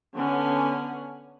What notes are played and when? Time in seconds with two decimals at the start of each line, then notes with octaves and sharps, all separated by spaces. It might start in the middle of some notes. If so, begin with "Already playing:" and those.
0.14 D3 B3 C#4 F#5 G#5